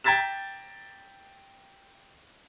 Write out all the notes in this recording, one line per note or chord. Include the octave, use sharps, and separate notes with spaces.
G5 A#5 G#6 A6 B6 E7